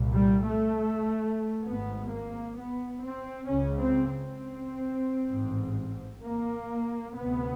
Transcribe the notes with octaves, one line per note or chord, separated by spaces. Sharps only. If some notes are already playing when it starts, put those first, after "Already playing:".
Already playing: C2 A#2
G3
A3
G#1 G#2 B3
A#3
B3
C4
C#2 C#3 C#4
C4
C4
A1 G#2
A#3
D2 C3 B3